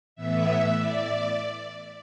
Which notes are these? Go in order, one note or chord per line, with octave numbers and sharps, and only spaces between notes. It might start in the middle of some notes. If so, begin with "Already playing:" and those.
A2 E3 B3 E5
D5